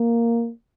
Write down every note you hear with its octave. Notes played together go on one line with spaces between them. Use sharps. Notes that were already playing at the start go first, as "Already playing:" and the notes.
Already playing: A#3